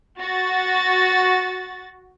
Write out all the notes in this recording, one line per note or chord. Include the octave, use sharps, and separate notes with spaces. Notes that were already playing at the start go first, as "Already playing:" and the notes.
F#4 A6